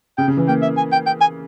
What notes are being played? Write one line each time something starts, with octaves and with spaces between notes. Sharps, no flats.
C#3 G5
C#3
E3
A#3 G5
E5
G#5
G5
G5
G#5